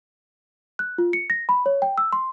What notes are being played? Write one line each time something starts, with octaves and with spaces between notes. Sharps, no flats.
F#6
F4
C#7
A#6
B5
C#5
G5
E6
C6